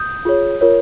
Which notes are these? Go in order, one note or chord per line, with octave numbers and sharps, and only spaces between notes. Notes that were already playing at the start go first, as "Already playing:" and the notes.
Already playing: D#6 G6
F4 G#4 C#5
F4 A#4 C#5